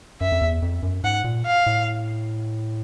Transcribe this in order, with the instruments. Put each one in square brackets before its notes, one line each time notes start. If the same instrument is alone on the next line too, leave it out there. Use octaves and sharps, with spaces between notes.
[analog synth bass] F#2 [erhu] E5
[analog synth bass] F2
E2
F2
F#2
[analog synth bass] G#2 [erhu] F#5
[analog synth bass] A#2
[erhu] F5
[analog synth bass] A2